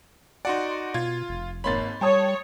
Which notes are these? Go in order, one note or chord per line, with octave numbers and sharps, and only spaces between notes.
D#4 F#4 D5 F#5 C6
B2 F4 G#6
F1
G#1 A#3 C#5 B5 C6 A6
G3 C#5 G5 A5 D#6